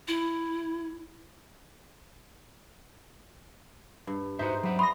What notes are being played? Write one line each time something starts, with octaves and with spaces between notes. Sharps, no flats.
E4
G2
G#2 D#4 F#4 B4 C5 E5
F#3 G3 E5 F#5
B5 C6 D#6 A#6